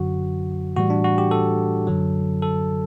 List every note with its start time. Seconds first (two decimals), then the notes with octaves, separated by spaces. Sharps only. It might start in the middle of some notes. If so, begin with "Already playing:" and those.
Already playing: F#2 D3 F#3 F#4
0.77 A2 E3 G3 F#4
0.90 D4
1.04 F#4
1.18 G4
1.31 A4
1.87 F#2 D3 F#3
2.42 A4